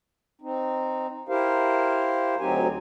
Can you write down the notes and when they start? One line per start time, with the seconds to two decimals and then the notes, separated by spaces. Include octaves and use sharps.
0.42 C4 D#4
1.29 E4 G4 A#4 C5 F5
2.40 D2 F#3 C4 D#4 G4 G#5